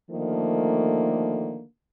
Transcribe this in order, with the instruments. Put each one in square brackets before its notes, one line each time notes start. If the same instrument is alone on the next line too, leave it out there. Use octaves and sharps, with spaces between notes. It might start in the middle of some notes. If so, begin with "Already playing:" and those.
[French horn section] D3 D#3 F3 A3 A#3